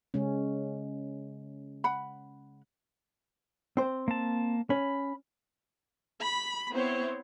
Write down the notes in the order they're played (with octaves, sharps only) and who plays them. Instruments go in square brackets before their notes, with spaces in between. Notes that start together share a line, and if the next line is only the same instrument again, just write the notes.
[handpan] C#3 G#3 C#4
[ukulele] F#5 B5
[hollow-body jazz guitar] C4 C5
[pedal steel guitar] A#3 A5
[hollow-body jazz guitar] C#4 [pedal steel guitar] B5
[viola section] B5
B3 C4 E4 C5 C#5